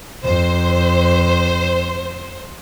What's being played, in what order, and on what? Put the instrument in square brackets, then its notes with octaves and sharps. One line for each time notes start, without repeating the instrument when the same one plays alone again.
[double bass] F2 [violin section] C5